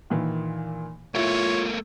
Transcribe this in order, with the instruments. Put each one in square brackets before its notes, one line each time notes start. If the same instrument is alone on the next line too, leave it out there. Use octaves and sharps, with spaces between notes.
[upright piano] A#2 D#3 E3
[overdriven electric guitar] A3 A#3 [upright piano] E4 [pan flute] F4 [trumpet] C#5